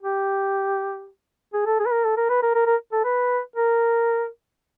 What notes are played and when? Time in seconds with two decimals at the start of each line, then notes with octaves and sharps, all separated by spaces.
0.03 G4
1.54 G#4
1.66 A4
1.80 G#4
1.86 B4
1.92 A#4
2.04 A4
2.17 A#4
2.30 B4
2.43 A#4
2.55 A#4
2.67 A#4
2.92 A4
3.05 B4
3.56 A#4